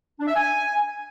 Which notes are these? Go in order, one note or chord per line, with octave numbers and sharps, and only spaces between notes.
D4
E5
G#5